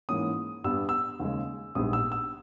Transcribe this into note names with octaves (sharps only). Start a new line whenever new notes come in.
G#2 E3 A#3 C#4 D#6
G2 G3 B3 E6
E6
D#2 C#3 G#3
A#1 G#2 G3 B3 D#6
E6
E6